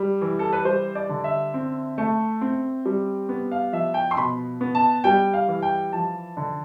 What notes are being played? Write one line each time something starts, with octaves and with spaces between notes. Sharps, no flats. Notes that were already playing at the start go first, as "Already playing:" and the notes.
Already playing: G3
E3
A4
B4
G3 C5
D5
D3
E5
C4
A3
C4
G3
B3
F5
F3 E5
G5
C6
B2 B5
B3
A5
G3 G5
F5
E3
G5
F3 A5
D3